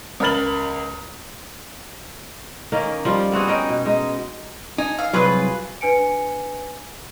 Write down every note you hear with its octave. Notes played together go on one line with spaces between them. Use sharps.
C#2 A#4 B5 F6 A6 F#7
D#3 A#3 C#4
F3 G3 F4
B3 C4 F#4 G#4
C#4 D#4 G5
B2
G#3 D#4
D#4 G#5
F5
C2 F#3 F4 G#4 B4
D4 B4 G#5 C#7 D7